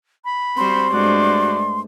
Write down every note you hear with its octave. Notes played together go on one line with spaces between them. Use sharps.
B5
G3 C4 F#4 C5 C6
G2 G#3 A3 F#4 C5 D5